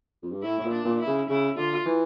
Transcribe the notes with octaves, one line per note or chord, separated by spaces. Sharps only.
F2
G2
A2 E4
A2
A#2
D4
A#2
E4
C#3
C#3 E4
D3 F4
E3